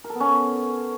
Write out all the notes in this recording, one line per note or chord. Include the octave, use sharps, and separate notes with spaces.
A#4
A4
B3
C#4